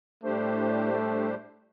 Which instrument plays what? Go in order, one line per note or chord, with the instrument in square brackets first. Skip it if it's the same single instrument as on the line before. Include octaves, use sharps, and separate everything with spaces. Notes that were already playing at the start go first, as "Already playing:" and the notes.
[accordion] A2 G3 D4 G4 C5 [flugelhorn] A3
[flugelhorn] A3